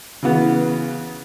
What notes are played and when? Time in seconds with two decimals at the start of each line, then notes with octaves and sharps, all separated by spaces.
0.23 C#3 E3 B3